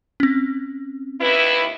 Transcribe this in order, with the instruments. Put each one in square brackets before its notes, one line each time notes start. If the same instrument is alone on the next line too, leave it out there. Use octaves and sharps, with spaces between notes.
[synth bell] C4 C#4
[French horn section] D#2 E4 B4